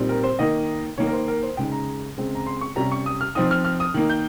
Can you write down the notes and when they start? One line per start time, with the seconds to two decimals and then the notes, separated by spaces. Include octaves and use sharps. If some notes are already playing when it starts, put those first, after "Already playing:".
Already playing: A#2 G3 C4 D#4
0.09 A#4
0.24 C5
0.39 D#3 A#3 D#4 D#5
0.98 D#3 A#3 D#4 C#5
1.07 A#4
1.13 C5
1.28 A#4
1.43 C5
1.57 C#3 G#3 D#4 G5
1.72 A#5
2.17 C#3 G#3 C4
2.35 A#5
2.47 C6
2.61 C#6
2.76 C3 G3 C#4 A#5
2.92 C#6
3.06 D#6
3.21 F6
3.35 F3 C4 D#4 D#6
3.51 F6
3.65 F6
3.80 D#6
3.94 D#3 A#3 D#4
4.09 G6